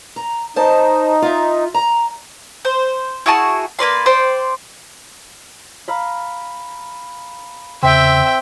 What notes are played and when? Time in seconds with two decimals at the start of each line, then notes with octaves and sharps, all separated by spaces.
0.16 A#5
0.56 D#4 C5 A5
1.22 F4 E5
1.74 A#5
2.65 C5
3.26 E4 F#4 G#4 A5
3.79 A#3 B4 D5 C6
4.06 C5 D5 G5 C6
5.88 F5 A#5 B5
7.83 E2 C#3 C4 E5 G5